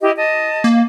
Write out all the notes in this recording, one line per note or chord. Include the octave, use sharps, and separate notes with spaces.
E4 G4 D#5
D#5 A5
A#3